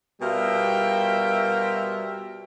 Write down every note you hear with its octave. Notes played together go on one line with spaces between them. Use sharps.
B2 G3 F4 A#4 E5 G5